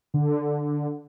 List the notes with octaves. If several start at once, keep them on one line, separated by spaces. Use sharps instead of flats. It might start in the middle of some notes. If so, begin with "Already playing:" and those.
D3